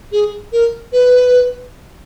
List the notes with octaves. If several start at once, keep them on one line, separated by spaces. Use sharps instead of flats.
G#4
A#4
B4